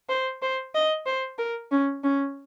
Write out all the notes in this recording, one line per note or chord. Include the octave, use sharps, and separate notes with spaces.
C5
C5
D#5
C5
A#4
C#4
C#4